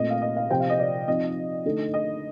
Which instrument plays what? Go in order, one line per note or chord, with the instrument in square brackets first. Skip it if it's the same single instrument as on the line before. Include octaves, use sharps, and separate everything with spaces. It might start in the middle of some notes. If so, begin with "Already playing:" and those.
Already playing: [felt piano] A#2 A3 C4 [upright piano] D#5
[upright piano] F5
D#5
F5
[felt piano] C3 F3 C4 G4 C5 [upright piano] G5
[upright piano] F5
D#5
D5
[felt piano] F3 C4 D#4 [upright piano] D#5
[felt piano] D3 A3 D#4 A4
[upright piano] D#5